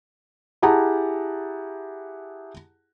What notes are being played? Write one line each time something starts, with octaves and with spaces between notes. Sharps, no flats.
E4 G4 G#4 F#5 A5 A#5